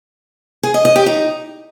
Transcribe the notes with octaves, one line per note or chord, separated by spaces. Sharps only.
G#4
D#5
D#5
G4
D#4